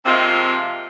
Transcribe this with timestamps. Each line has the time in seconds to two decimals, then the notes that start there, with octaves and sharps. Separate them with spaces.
0.06 F2 C3 G#3 A#3 C4 F4